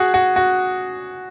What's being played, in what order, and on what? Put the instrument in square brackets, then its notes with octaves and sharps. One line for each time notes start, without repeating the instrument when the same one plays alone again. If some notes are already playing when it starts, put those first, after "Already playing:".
Already playing: [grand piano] F#4 G#4
F#4
F#4